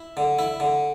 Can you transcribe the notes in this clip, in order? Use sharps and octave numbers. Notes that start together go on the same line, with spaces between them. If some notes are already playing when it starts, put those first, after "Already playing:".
Already playing: E4
D3
E4
D3